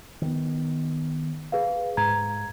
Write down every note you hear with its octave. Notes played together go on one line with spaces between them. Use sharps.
D#3 B3
G#4 B4 F5
G#2 A#5 G#6